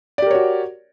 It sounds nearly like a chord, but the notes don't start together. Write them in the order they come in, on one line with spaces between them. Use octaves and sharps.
D5 G4 A#4 C#5 F#4